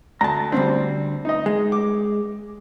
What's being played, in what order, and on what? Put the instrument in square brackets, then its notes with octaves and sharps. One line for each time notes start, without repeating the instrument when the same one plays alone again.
[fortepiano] D2 [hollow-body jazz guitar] A5 A#5
[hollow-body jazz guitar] D2 G#2 D4 [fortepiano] G3 C4
[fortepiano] D#4 D#5
[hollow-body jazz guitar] G#3
[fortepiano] D6